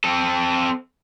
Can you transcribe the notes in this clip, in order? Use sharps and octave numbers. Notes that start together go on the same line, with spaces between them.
C4 A4